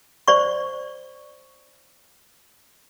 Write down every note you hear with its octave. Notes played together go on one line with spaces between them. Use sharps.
C5 D5 C#6